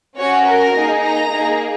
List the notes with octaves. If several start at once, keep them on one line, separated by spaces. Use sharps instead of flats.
C#4 F#4 C#5
A#4
A#3 D#4 G#4
A#5
A#3 D#4 G#4